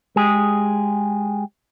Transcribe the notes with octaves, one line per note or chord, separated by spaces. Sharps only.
G#3 G4 G#4